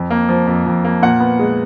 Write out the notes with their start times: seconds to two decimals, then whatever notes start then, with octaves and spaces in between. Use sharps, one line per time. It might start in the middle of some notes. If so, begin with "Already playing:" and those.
Already playing: F2
0.10 A#3
0.29 F3
0.47 F2
0.66 F2
0.85 A#3
1.02 A#2 F#5
1.20 B3
1.39 G#3